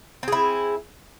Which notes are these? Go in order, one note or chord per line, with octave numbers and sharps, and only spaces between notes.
C4 E4 G#4